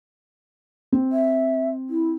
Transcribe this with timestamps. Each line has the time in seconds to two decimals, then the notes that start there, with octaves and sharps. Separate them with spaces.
0.92 C4
1.12 E5
1.90 E4